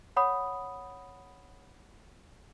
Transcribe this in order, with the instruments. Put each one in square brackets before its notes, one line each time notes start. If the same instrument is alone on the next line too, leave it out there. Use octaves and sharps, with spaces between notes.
[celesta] C#5 F#5 B5 D#6